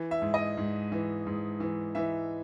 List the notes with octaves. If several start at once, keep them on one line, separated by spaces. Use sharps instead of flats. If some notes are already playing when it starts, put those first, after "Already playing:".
Already playing: E3
E5
G#2
D#5
G#2
E3
G#2
E3
E3 E5